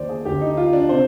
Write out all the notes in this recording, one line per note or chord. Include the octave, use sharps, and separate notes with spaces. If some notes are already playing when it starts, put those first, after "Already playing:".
Already playing: D#2 D#3 C5 D5
G#4
D2 D3 G4
D#4
F4
D4
C3 C5